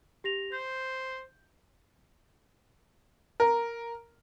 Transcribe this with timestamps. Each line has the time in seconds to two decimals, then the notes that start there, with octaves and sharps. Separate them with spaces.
0.24 G4 A#6 F7
0.52 C5 G6
3.40 A#4